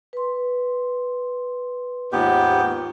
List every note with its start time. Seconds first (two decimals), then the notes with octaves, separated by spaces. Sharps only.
0.13 B4 C6
2.12 D#2 G#2 B3 F4 G4